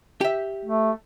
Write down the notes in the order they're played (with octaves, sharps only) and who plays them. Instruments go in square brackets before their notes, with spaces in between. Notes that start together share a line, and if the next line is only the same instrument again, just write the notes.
[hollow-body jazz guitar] G4 E5
[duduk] A3